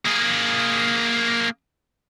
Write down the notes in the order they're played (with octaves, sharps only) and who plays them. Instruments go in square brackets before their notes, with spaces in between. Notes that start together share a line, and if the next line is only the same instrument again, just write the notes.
[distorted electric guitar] A#3 G#4